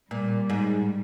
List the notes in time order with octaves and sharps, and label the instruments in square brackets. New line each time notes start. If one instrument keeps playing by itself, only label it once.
[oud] A#2 [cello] G3
[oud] G#2